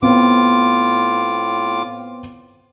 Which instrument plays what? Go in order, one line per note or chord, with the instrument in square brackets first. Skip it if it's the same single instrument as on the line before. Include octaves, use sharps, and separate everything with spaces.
[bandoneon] A2 F4 D6 [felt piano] B3 C4